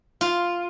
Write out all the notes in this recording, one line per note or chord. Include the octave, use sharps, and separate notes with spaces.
F4